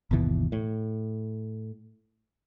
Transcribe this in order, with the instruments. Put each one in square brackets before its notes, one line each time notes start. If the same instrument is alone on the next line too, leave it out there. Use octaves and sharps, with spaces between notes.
[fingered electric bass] G1 D#2 B2 E3
A2